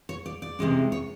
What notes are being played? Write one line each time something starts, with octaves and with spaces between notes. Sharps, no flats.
C#5
D5
D5
C3 E3 G#3 C#4
C#5